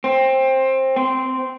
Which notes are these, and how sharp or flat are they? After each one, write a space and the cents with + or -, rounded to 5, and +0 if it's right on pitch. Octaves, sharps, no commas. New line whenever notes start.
C4 +20
C4 -10